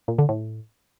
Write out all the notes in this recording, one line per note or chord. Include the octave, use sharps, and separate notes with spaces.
A#2
D3
A2